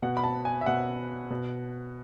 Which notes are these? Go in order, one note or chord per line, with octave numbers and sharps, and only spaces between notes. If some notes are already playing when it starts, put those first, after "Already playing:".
B2 F#5
B5
A5
G#5
E5
B2 F#5
B2